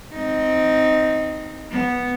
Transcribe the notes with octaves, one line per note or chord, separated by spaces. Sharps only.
C4 D#4
B3